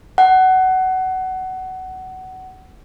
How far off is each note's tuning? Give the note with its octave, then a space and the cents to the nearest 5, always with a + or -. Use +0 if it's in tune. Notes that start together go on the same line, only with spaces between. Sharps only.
F#5 +20